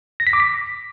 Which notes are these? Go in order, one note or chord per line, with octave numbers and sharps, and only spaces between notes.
A#6
B6
D6
B6